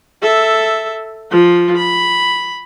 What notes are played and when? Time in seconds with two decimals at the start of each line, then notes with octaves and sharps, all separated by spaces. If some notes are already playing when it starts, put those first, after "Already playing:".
0.22 A4 E5
1.31 F3 F4
1.77 B5